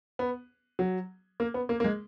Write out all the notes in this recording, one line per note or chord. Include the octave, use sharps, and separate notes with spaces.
B3
F#3
A#3
B3
A#3
A#3
G#3